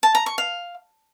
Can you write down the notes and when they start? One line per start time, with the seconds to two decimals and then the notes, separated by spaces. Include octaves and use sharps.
0.03 A5
0.15 A#5
0.26 C#6
0.38 F5